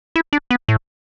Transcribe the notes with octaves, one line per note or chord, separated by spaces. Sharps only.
E4
D4
B3
A2